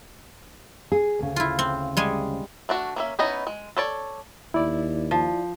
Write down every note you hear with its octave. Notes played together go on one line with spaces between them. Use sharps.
G#4
D2 C#3
E4 F4
C4
G3 G#3 G#4
A3 D4 F#4
A#3 C#4 E5
B3 C#4 D#4 E4 D#5
G#3
A4 C#5 D5
D#2 E4 D5
F3